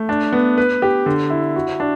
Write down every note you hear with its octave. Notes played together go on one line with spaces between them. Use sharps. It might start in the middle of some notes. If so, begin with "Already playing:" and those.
Already playing: A3
D4
B3
B4
G4
D3
E4
F#4
D4